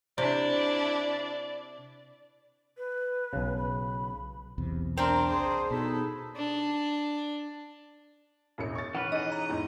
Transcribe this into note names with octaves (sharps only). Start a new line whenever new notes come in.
C3 D4 E4 D5
B4
B1 C#3
B5
B1 E2 C3
C4 D4 A#4
G#4 C5
B2 D#4 G#4 A4 B5
D4
E1 A1 C#7
C#6 A6
E3 C#4 B4 F#5
D#4 G#4 D#5 D#7
A#5
E2 G#2